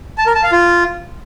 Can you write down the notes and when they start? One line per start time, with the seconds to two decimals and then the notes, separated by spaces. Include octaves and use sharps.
0.18 A5
0.26 A#4
0.35 A5
0.43 F5
0.52 F4